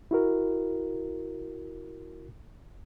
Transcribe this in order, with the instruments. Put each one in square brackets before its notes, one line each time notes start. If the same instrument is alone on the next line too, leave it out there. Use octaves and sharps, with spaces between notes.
[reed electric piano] E4 F#4 A#4